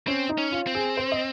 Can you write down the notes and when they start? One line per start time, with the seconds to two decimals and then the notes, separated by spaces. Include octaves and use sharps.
0.07 C4 C#4
0.29 D#4
0.38 C#4
0.52 F4
0.67 C4
0.75 G#4
0.97 C5
1.12 D#5